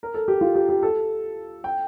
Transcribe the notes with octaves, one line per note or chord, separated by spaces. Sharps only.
A#4
A4
G4
F4
G4
G4
A4
G5